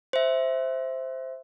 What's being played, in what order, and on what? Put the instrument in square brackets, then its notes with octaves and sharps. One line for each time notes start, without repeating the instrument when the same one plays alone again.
[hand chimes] C5 E5